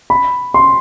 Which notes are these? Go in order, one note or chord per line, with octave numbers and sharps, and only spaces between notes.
B5
C6